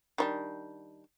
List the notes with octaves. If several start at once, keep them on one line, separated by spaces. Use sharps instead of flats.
D#3 G3 D4